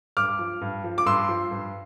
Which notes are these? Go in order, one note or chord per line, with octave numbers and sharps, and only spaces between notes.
G2 D6 F6
F3
G2
F3
D6
G2 C6 E6
F3
G2